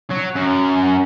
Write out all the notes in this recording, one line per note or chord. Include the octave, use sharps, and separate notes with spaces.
F#3
F#2